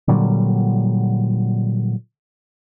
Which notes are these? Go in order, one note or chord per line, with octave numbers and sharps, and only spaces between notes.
A#2 D3 F#3 G3